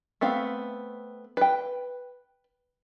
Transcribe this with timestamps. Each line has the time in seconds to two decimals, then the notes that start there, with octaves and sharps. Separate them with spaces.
0.21 A3 B3 C4 F5
1.37 B4 G5